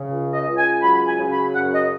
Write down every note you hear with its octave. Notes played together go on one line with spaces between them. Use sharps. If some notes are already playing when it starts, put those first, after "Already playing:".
Already playing: C#3
C#2
D#5
C#2
G#5
F#3 B5
G#5
C#3
B5
F#2 F#5
D#5